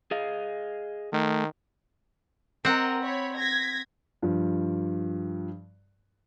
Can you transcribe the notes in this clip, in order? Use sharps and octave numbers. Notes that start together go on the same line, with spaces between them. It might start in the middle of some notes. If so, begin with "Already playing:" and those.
G#4 D#5 F5
D#3 A3
C4 A#4 D#5 F#5
C#5 B5
G#6 A#6 B6
G2 F3